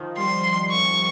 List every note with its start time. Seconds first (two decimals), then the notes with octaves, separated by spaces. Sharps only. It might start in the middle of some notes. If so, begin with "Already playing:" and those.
Already playing: D#3 F3
0.18 G3 C6
0.71 C#6